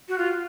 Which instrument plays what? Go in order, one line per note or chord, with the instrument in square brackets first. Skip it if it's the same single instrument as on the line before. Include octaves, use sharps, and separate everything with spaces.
[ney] F#4
F4